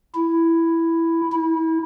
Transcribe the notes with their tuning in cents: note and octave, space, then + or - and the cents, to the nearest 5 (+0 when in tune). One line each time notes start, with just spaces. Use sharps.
E4 +5
E4 -30